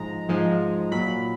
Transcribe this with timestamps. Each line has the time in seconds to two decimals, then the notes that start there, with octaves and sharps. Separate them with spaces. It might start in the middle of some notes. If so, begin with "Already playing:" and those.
Already playing: G#2 F3 G#3 A#5
0.28 G#2 F3 G#3
0.91 A#2 F#3 B5